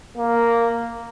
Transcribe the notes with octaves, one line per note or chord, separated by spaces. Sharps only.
A#3